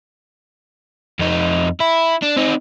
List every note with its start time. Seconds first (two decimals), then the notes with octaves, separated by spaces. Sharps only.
1.19 F2 D#4
1.80 E4
2.22 D4
2.37 C4 D#4